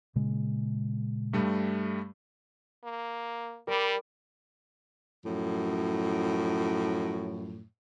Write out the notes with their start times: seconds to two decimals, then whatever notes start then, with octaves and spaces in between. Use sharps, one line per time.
0.16 A#2 C#3 G#3
1.33 G2 G3 A3
2.84 A#3
3.67 G3 A#4 B5 D6
5.24 F#2 A2 F3